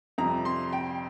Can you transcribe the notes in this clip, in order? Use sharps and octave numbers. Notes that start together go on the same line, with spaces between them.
F2 C3 G3 A#5
C6
G5